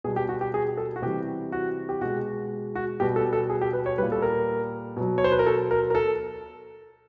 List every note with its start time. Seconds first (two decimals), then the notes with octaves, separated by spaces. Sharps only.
0.04 B2 G3 G#4
0.16 G4
0.29 F#4
0.41 G4
0.54 G#4
0.77 A4
0.96 F#4
1.02 C3 E3 G3 G4
1.52 F#4
1.89 G4
2.01 B2 G#3 F#4
2.75 F#4
3.00 B2 G3 G4
3.16 A4
3.33 A4
3.50 G#4
3.61 G4
3.73 B4
3.86 C#5
3.98 G3 B4
4.02 A#2
4.12 A4
4.22 A#4
4.97 B2 F#3
5.18 C#5
5.24 C5
5.32 B4
5.39 A#4
5.46 A4
5.71 A#4
5.90 A#4
5.95 A4